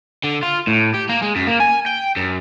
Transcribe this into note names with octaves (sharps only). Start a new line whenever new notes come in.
D3
F4
A2
G4
A#3
G#3
F#2
A#3
G#5
G5
F#2